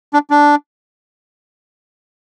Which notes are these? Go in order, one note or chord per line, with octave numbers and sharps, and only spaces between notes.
D4
D4